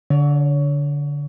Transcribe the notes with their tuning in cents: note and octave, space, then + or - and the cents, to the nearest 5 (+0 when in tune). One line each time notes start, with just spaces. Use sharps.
D3 -15 C#5 +25